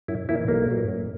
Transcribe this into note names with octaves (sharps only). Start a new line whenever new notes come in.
F#2 E4
E3 A#3 E4
B1 A#3
A#2 F#3 A#3
F#2